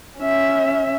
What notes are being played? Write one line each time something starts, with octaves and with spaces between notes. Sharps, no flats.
C#4 E5